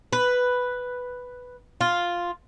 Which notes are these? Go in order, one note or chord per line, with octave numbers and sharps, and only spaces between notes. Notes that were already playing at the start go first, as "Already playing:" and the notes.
B4
F4